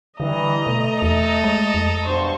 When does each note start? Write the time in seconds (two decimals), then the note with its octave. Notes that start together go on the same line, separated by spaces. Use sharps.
0.20 D3 E3 G3 D#5 A#5
0.67 B2 A3
1.02 E2 A4
1.44 G#3
1.74 F2
2.06 G2 B2 C5 C#6